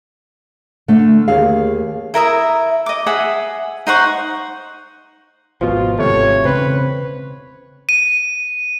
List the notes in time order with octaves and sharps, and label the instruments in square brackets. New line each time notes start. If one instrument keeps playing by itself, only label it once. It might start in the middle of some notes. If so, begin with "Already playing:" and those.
[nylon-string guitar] D3 A3
D#2 G#4 F5
[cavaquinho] E4 A#4 E5 D#6
D#5 D6
G#4 E5 F#5 D#6
D#4 C5 F#5 C#6
[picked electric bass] G#1 B2 F3 [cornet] F4
[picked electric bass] G#1 C3 A3 [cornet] C#5
[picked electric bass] E1 C#3 C4 [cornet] B4
[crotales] D#7